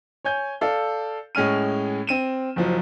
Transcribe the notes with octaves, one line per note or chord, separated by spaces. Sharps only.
C#5 G#5 G6
A4 D5 F5
A2 G#3 C#4 F6 D#7
C4 D#7 E7
F#1 F3 F#3